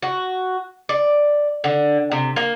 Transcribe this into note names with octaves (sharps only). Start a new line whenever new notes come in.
F#4
D5
D3
C3
A#3